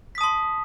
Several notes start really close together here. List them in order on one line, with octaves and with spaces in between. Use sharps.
B6 D#6 A5 C6